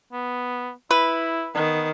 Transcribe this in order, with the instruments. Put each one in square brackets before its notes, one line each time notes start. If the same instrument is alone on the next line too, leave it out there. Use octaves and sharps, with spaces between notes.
[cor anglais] B3
[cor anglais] E4 [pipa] B4
[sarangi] D#3 [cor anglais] B3